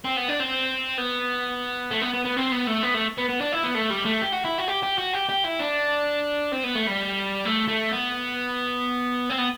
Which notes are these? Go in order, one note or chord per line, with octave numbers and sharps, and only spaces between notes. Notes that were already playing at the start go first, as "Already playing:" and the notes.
C4
B3
D4
C4
B3
A3
B3
B3
B3
C4
B3
A3
B3
A3
B3
B3
D4
E4
B3
A3
G3
A3
G4
F#4
E4
F#4
G4
G4
F#4
G4
G4
E4
D4
C4
B3
A3
G3
A3
A3
B3
C4
B3